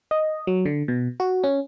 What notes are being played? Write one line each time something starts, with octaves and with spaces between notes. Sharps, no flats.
D#5
F#3
D3
B2
F#4
C#4